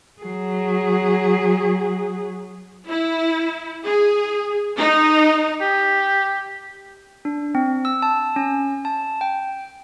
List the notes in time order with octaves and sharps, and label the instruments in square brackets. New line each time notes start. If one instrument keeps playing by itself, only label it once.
[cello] F#3 G#4
[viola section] E4
G#4
D#4
[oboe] G4
[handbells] D4
C4
E6
A5
C#4
A5
G5